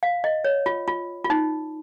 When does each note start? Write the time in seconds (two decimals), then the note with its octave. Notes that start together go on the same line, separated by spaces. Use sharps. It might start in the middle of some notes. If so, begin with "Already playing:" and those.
0.03 F5
0.24 D#5
0.45 C#5
0.66 F4
0.88 F4
1.24 F4
1.30 D#4